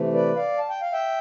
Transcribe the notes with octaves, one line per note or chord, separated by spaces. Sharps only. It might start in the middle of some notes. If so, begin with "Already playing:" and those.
Already playing: C3 E3 A3
B4 D5
D5 F5
A5
G5
F5
E5 G5